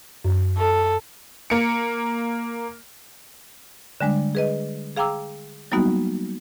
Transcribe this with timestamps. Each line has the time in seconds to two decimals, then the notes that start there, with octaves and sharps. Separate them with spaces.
0.25 F#2
0.57 A4
1.50 A#3 C#7
4.01 D3 G3 G#3 D4
4.35 G#4 B4 D#5
4.97 G#4 F5 G5 A#5 D6 E6
5.72 F#3 G3 A#3 B3 D#4 F#4